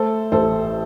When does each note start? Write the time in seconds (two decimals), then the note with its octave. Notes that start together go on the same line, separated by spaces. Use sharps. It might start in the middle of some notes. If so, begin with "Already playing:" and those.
Already playing: A3 A4 C5
0.32 A1 A4 C5